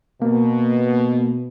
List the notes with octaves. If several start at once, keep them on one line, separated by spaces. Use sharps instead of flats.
B2 A#3